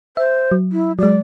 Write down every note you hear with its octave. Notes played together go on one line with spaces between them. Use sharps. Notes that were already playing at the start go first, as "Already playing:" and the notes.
C5 E5
F#3
E4
F#3 G#3 D5